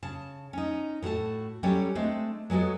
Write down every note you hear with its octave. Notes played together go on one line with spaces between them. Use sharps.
C#3 A5
C#4 D#4
A2 F#4 A4 A5
F#3 G3 C#4 G4 A4 C#5
G#3 A3 C4 D4
F#3 G#3 B3 F#4 A4